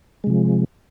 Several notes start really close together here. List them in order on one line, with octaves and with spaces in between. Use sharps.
G#3 C3 F3